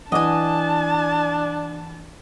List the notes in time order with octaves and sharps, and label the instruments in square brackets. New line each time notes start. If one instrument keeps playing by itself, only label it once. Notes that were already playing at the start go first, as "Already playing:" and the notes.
[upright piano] E3 F#5 D6 [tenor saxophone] D4 [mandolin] D#5 G#5 [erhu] A5